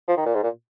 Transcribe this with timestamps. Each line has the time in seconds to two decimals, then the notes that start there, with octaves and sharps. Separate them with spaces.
0.08 F3
0.17 D#3
0.26 A#2
0.35 G#2
0.43 A#2